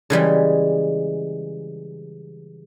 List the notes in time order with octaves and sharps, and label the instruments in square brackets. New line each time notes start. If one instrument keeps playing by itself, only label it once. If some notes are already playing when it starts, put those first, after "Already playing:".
[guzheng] C#3 E3 G3 G#3